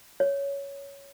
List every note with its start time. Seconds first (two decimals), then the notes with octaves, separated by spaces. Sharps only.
0.20 C#5